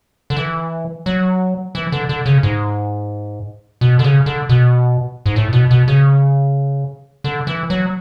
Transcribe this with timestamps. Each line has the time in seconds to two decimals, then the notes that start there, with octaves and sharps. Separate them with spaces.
0.30 D3
0.37 E3
1.06 F#3
1.75 E3
1.92 D3
2.09 D3
2.26 C#3
2.43 G#2
3.81 B2
3.99 D3
4.04 C#3
4.26 D3
4.49 B2
5.26 G#2
5.36 A2
5.53 B2
5.71 B2
5.88 C#3
7.24 D3
7.47 E3
7.70 F#3